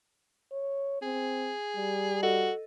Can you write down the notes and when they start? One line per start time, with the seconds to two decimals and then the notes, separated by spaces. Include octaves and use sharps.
0.52 C#5
1.02 C4 G#4
1.76 G3
2.23 F#4 A4 D#5